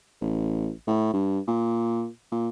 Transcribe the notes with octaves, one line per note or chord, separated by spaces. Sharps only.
A1
A2
G2
A#2
A#2